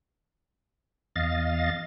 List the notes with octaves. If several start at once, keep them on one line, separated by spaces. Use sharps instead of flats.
E2 D#5 F5 A6